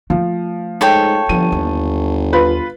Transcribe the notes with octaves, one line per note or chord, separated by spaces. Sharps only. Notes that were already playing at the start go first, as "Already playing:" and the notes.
F3 A3
G#2 A4 C#5 G5
G1 F3 D#7
D#2
F4 B4